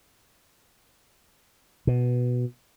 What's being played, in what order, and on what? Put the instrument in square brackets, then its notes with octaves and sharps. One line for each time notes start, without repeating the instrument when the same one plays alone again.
[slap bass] B2